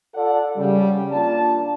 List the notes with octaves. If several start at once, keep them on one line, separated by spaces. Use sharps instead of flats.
F4 A4 D5 F#5
C#3 G3
A#3 D4 F4 D5 A5